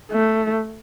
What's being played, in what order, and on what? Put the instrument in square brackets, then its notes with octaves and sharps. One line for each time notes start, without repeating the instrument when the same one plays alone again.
[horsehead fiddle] A3